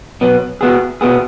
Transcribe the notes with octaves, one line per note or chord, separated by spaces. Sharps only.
B2 F#3 B3
B2 B3 G#4
B2 B3 G#4